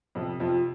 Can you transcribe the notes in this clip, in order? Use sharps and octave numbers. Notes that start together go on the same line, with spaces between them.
F2 C3 F3
F2 F3
F4